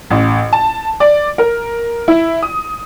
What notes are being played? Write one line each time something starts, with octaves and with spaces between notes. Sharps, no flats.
A1
A5
D5
A#4
E4
D#6